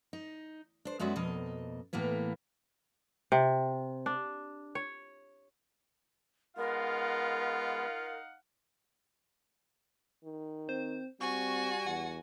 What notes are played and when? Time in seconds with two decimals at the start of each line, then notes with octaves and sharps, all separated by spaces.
0.13 D#4
0.85 D4 C5
0.99 F#2 G#3 B3 F#4 D5 E5
1.16 F2 B2 A#3 D#5
1.93 A2 E3 A#3 B3
3.32 C3
4.06 D4
4.75 C#5
6.57 G#3 B3 D#4 F4 A#4 F5 F#5
10.24 D#3
10.69 C4 C5
11.21 G3 C4 F#4 G#5 C#6
11.86 E2 F#5